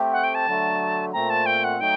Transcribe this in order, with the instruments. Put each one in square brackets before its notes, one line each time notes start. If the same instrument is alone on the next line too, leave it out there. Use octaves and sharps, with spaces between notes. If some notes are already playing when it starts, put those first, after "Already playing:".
Already playing: [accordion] A3 C4 G4
[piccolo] F#5
G5
A5
[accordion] D3 F#3 A3
[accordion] A#2 A3 C4 [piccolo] A#5
[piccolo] A5
G5
F#5
[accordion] F#3 A3 D#4 [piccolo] G5